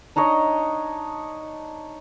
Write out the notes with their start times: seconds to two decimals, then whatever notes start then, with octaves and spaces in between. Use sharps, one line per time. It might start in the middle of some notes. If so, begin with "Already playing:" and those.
0.16 D4 D#4 C#5 D#5